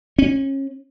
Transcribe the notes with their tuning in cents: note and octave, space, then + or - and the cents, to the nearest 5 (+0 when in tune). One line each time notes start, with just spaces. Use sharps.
C#4 -30